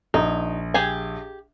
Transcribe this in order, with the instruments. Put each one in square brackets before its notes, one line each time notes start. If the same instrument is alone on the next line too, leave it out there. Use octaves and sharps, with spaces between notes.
[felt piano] A#1 [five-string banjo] D#4
[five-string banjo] G4 G#4 G#5